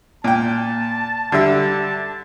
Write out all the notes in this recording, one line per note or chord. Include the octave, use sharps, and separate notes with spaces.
A#2 G5 A5
D3 G3 E5 A5